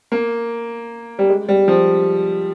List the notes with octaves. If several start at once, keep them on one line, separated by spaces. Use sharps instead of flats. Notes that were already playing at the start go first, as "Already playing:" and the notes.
A#3
G3
G#3
G3
F3